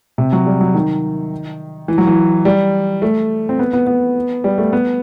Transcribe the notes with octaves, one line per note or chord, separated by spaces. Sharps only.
C3
F#3
G3
F#3
D#3
E3
F#3
E3
G3
A3
C4
B3
B3
B3
G3
A3
B3